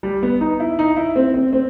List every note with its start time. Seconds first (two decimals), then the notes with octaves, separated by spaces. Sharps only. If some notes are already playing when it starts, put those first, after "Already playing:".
0.03 G3
0.23 B3
0.41 D#4
0.60 E4
0.79 D#4
0.96 E4
1.16 C4
1.34 C4
1.53 C4